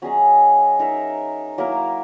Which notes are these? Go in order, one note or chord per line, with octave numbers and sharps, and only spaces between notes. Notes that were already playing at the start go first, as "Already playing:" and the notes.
F#3 C#4 G#4 D#5
D#4 A#4 E5
F#3 A#3 E4 A#4